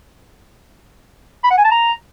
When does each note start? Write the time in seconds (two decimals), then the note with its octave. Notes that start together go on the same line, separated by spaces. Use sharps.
1.44 B5
1.51 F#5
1.58 G#5
1.64 A5
1.71 A#5